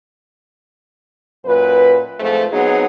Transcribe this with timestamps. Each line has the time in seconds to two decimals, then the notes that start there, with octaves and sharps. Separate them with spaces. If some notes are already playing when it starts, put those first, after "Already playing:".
1.46 F#2 A#2 B4
2.19 F2 G#2 F3 A3
2.52 F#3 B3 C4 D#4 G#4